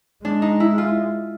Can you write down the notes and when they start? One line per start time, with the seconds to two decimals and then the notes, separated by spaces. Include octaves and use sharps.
0.25 G#3 D4
0.42 D#4
0.60 E4
0.78 F4